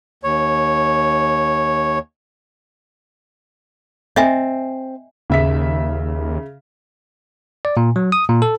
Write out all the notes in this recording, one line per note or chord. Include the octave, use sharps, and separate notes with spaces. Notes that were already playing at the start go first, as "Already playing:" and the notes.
D#2 C#5
C4 D#5 E5 G#5
D#2 C#3 E5 B6
D5
A#2
F#3
D#6
A#2
A4